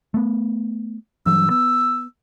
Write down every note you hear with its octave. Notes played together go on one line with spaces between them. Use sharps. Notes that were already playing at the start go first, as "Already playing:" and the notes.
A3 B3
G2 E3 F#3 E6
B3 E6